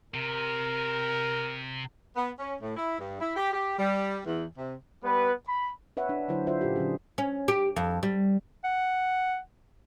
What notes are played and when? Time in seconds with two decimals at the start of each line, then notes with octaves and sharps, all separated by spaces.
0.14 C3 A#4
2.15 B3
2.39 C#4
2.60 A2
2.75 E4
2.98 G2
3.20 E4
3.35 G4
3.52 G4
3.77 G3
4.25 E2
4.57 C3
5.03 G3 B3 B4
5.47 B5
5.97 B4 C#5 E5 F#5
6.09 D4
6.28 D3 F#3 E4 C5
6.47 D3 D4 F4 C5 D5 E5
6.61 A#2 C#4 F4 G4
6.76 D3 F#3 C#4 G#4
7.18 C#4
7.48 G4
7.76 F2
8.03 G3
8.64 F#5